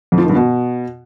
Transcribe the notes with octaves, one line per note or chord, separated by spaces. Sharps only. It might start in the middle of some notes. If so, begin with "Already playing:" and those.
F2
F3
D#3
G2
B2